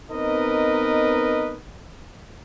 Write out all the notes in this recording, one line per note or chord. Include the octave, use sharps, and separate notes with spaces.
B3 C4 D#4 A#4 B4 D#5